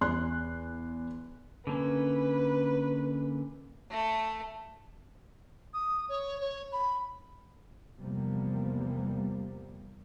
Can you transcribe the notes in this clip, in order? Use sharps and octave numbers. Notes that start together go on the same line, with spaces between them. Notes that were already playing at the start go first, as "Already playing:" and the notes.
E2 C6 F#6
D3 A#3 C#4 B4
A3
D#6
C#5
C#5
B5
E2 C3 F3 G3 A#3 B3